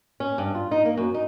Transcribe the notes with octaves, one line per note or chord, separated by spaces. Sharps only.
C#4
G2
F4
D#4
A#3
F#2
D#4